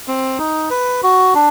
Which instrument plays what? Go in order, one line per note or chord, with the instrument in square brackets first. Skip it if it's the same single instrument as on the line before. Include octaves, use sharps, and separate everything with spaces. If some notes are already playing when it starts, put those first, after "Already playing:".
[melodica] C4
D#4
B4
F#4
D4